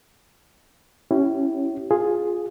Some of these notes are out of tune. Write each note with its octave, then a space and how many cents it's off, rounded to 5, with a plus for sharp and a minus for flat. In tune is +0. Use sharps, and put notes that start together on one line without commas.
C#4 +0 E4 +0 G4 -40
F4 +15 G#4 +0